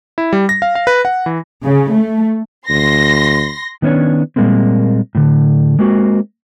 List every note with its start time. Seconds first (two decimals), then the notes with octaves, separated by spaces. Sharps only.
0.18 E4
0.33 G3
0.49 A#6
0.62 F5
0.75 F5
0.87 B4
1.05 F#5
1.26 E3
1.62 C#3
1.92 A3
2.69 D2 C6 A#6
3.82 D#3 B3 C#4 D4 C#5
4.36 A#2 C#3 G3 G#3 A#3 C4
5.15 A2 D3
5.79 G#3 A#3 C4 F#4